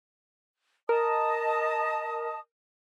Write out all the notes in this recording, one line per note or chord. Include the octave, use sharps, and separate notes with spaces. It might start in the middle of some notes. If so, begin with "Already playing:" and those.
A#4 D#5 A5 D#6